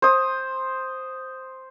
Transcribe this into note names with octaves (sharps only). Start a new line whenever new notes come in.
C5 D#6